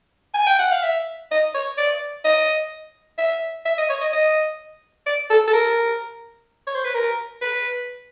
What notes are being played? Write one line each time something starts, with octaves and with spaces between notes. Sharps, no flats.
G#5
G5
F#5
F5
E5
D#5
C#5
D5
D#5
E5
E5
D#5
C#5
D#5
D#5
D5
A4
A4
A#4
C#5
C5
B4
A#4
B4